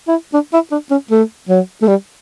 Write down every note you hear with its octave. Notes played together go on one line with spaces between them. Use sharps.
E4
D4
E4
D4
C#4
A3
F#3
A3
G3